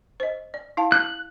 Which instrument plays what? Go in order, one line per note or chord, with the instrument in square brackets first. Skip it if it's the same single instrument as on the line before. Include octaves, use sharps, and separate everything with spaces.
[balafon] C5 D#5
D5
E4 F5 A5
[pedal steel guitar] F#6